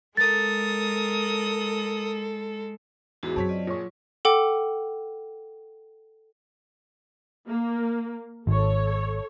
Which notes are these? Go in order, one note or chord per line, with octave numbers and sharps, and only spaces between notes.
G#3 A4 A#4 D#6 A6
E2 G#2 E3 F#4 G#4
F#2 C4 C#5 A5 B6
F4 D5 D#5
A#2 F#3 F4 G#4 C#5 C#6
A4 F#5 G5 D6
A#3
G#1 A4 C#5